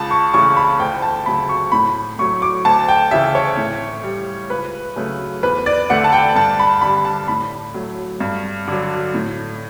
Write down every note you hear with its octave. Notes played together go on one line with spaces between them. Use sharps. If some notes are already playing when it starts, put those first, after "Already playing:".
Already playing: C#2 A5
C#6
C#3 E3 A3 C#6
B5
D2 G5
A5
C#3 F#3 A3 B5
C#6
A2 B5
F#3 A3 C#6
D6
D2 A5
G5
C#3 E3 E5
C#5
A2
G3
C#2 B4
C#3 F#3 A3
E2 B4
D5
D3 A3 F#5
A5
G5
G2 A5
B5
D3 G3 B5
A5
A2 B5
F#3 A3
G2
D3 F#3
A2